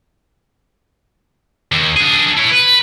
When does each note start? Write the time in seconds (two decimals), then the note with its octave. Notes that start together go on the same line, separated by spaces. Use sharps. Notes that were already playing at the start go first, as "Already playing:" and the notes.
1.72 D#2
1.96 D4 G#4
2.37 E4 C#5
2.52 B4